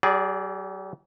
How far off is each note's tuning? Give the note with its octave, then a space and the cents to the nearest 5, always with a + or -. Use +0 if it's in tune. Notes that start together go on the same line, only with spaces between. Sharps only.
G3 -45 G#4 +0 D5 +0